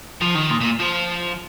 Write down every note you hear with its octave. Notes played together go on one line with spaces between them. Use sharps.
F3
D#3
A#2
A#2
F3